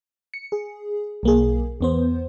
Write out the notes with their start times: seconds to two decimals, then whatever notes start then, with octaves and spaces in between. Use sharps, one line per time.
0.34 C#7
0.52 G#4
1.23 B1 A#3 G#4
1.81 E2 B3 C5